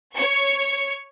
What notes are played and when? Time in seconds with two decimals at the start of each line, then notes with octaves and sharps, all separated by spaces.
0.14 C#5 C#6